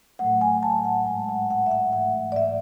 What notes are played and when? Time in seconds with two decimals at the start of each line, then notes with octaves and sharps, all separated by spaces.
0.19 A2 F#3 A3 F#5
0.41 G#5
0.63 A5
0.85 F#5
1.06 G#2 G#3 G#5
1.29 F#5
1.50 F#5
1.66 E5
1.71 F#5
1.93 G#2 E3 A3 F#5
2.32 D5
2.36 E5